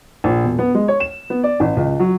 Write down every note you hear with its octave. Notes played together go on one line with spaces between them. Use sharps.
A#1
E1
B3
G#3
C#5
E7
B3
D5
A1
C#2
F#3